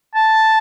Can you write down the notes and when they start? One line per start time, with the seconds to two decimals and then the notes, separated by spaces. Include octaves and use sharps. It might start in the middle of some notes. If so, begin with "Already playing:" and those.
0.15 A5